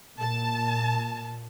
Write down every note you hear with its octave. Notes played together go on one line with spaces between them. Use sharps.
A#2 A5